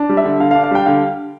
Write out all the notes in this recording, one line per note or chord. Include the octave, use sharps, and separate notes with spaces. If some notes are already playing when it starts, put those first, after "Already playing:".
Already playing: D4
G3
E5
D3
D3 F5
F5
D4
F5
G3 G5
D3 F5